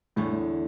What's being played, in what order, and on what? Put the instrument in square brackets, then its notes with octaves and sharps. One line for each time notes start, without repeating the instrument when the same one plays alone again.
[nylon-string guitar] E2 D3 A3 [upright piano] A2
[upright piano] A2